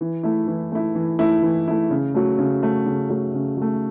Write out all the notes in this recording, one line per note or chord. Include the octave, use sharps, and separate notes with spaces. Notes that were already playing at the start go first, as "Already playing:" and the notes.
E3
A3 E4
E3
A3 E4
E3
A3 E4
E3
A3 E4
C#3
F#3 A3
C#3
F#3 A3
C#3
F#3 A3
C#3
F#3 A3